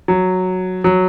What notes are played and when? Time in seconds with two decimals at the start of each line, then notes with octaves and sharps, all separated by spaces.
0.08 F#3
0.84 F#3